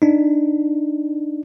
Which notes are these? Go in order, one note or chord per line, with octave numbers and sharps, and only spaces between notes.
D4 D#4